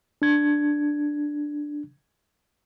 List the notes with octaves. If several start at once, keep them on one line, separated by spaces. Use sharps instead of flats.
D4 G#6